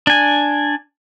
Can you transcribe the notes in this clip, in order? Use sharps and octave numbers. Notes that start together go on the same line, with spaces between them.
D4 G#5